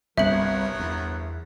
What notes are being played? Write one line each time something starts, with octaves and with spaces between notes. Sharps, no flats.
G1 C2 F#3 B3 A#4 E5 F#7
E2